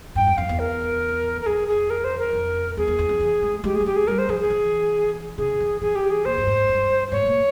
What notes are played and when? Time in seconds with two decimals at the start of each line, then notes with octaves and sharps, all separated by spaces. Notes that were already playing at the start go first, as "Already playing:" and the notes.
0.15 G2 G5
0.27 F2
0.37 F2 F5
0.49 E2
0.59 A#4
1.41 A#4
1.46 F2 G#4
1.68 G#4
1.90 A#4
2.04 C5
2.19 A#4
2.33 F2
2.77 E2 G#4
2.88 E2
2.99 E2
3.09 F2
3.20 E3
3.42 G#3
3.64 G#3 G4
3.75 G#4
3.81 G3
3.86 G#3 G4
3.96 G#4
4.07 G3 A#4
4.18 C5
4.29 F3 G#4
4.40 G#4
4.50 E3
5.38 C#3 G#4
5.60 E3
5.81 E3 G#4
5.95 G4
6.10 G#4
6.25 A#2 C5
6.38 G2
6.47 G#2
6.69 G2
7.12 G#2 C#5
7.26 A#2